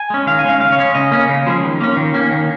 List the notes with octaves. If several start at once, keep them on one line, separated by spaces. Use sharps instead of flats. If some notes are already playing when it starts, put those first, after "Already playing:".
Already playing: G#5
G#3 C#4
D#3 F5
G#5
G#3 C#4 F5
C#3 F5
C#5
G#3 C#4
C#3 D#5
A#3 C#4
C#3
F3 G#3 C#4
D#3
A#3 C#4
D#3
A#3 C#4
D#3